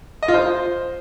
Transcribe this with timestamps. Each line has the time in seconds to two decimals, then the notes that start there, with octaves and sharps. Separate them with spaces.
0.23 D#5
0.28 F4
0.34 C5